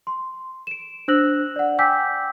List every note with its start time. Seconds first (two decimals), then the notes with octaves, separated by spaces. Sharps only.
0.07 C6
0.67 D7 E7
1.08 D4 C5 E6 F#6 A#6 F#7
1.56 D5 F#5
1.79 G5 G#5 D6 E6 G6 B6